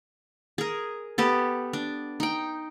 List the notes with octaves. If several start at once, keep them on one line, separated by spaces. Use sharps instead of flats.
G#4 A#4
B3 G4 A4
D4
D#4 G5